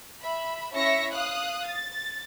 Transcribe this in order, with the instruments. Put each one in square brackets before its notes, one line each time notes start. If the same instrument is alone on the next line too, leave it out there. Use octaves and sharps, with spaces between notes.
[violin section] E5 B5
C#4 E4 C#5 E5 A#6 C#7
F5 D#6 F#6
A6